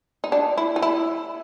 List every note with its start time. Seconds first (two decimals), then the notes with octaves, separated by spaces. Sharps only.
0.24 D#4
0.32 D4
0.57 E4
0.76 D#4
0.82 E4